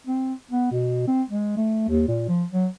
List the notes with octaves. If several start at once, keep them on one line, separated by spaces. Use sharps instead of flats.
C4
B3
B2
C4
G#3
A3
D#2
A#2
F3
F#3